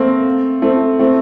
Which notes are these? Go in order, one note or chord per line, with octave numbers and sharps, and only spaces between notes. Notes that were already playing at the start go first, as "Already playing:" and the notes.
Already playing: A3 A#3 C4
A3 C4
A3 C4